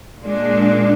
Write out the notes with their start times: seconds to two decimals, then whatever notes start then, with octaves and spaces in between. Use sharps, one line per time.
0.22 A#2 G#3 D4